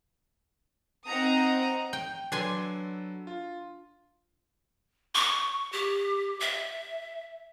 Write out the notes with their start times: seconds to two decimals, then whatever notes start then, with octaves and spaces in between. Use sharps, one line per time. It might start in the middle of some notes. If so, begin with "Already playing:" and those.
1.05 C4 D#4 F#5 A#5 D#6
1.93 G5
2.32 F#3 D4 A4 B4 G#5 C6
3.27 F4
5.15 C#6
5.72 G4
6.40 E5